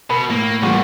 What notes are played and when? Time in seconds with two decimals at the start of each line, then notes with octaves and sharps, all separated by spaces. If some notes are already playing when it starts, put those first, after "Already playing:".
0.10 B2 A#4 B5
0.30 A2 A#3
0.63 C2 E3 G3 A#3 F4 G4 G#4 F#5